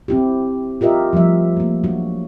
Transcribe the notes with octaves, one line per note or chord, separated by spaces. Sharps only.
C4 E4 G4
F4 G4 A#4 D#5 E5
F3 G3 A3 E5
A3 A#3
F#3 D4 F#4